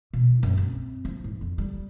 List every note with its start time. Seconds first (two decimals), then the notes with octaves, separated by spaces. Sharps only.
0.13 B2
0.43 F#2
0.57 C4
1.05 F3
1.24 G#2
1.41 F2
1.58 G3